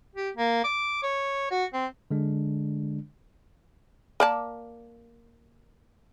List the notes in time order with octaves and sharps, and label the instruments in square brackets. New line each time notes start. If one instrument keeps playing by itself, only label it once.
[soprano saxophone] G4
A#3
D6
C#5
F#4
C4
[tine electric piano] D3 G#3 D4
[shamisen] A#3 D5 A5